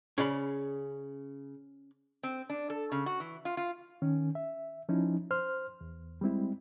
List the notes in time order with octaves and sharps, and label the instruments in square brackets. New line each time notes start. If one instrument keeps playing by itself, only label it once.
[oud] C#3 [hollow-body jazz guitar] C#4 D5 B5
[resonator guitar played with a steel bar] C4
D4
A4
C#3
F#4
E3
F4
F4
[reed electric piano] D#3 C#4
E5
F3 C#4 D#4 E4
C5 C6 F6
E2
G3 G#3 C4 E4